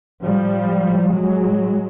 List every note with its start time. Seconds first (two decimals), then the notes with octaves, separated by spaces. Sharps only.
0.24 A2 F3 G3
0.84 A2
1.13 F#3 G#3
1.44 A2